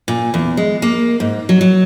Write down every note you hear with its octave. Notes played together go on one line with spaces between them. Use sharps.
A#2
E2
G#3
A#3
G#2
F#3
F#3